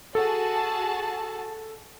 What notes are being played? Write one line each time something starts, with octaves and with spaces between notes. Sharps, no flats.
F#4 G#4 A4 A5